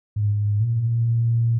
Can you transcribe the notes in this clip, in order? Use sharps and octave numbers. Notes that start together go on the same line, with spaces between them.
G#2
A#2